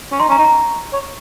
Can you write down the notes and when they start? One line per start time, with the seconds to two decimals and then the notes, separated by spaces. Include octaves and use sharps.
0.12 C#4
0.20 D#4 C6
0.29 C#4
0.32 A#5
0.38 D#4
0.44 A#5
0.93 C#5